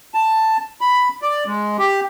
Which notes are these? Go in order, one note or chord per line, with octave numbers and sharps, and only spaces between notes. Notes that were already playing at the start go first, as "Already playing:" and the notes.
A5
B5
D5
G#3
G4